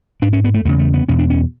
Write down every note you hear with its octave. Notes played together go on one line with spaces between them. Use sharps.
G#2 D4
C#4
B3
A3
E2 C#3 A3
A3
B3
E2 B2 C#4
D4
C#4